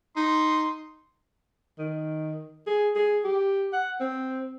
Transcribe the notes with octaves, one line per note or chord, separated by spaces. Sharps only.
D#4 C6
D#3
G#4
G#4
G4
F#5
C4